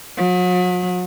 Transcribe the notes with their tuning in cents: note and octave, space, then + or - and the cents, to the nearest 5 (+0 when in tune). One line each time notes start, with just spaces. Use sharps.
F#3 -40